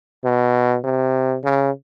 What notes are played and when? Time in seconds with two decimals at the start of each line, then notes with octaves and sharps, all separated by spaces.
0.25 B2
0.84 C3
1.44 C#3